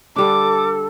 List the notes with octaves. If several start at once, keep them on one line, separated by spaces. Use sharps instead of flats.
D3 G3 D4 A4 D6